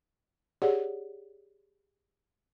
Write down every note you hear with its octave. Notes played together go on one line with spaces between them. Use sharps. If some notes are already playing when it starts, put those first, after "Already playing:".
G4 G#4 C#5 D5 F#5